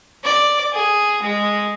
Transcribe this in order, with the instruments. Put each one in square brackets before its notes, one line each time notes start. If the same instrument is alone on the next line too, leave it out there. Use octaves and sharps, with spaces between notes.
[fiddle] D5
G#4
G#3